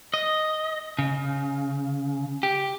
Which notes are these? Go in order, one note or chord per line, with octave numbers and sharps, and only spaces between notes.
D#5
C#3
G4